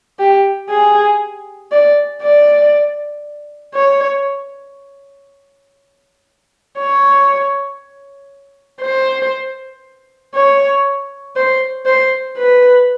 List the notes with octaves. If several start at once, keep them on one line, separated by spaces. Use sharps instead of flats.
G4
G#4
D5
D5
C#5
C#5
C5
C#5
C5
C5
B4